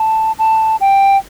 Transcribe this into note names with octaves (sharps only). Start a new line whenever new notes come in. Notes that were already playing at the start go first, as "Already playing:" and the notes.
Already playing: A5
A5
G5